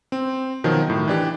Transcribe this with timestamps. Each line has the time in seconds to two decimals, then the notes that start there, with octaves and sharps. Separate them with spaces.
0.12 C4
0.64 B2 D#3 F3 F#3
0.88 A2 D#3
1.08 E3 D4 G4